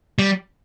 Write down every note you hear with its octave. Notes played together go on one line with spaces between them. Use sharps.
G3